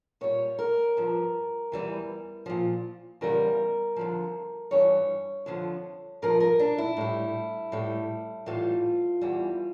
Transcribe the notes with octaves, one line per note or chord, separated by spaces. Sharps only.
A#2 G3 C#5
A#4
G2 F3
E2 E3 G3
A#2 F3
E2 C#3 G3 A#4
F2 D3 F3
G2 E3 G3 C#5
F2 D3 F3
G2 F3 A#4
A#4
D4
E4
A2 G3
A2 G3
A2 E3 G3 F4
E2 E3 G3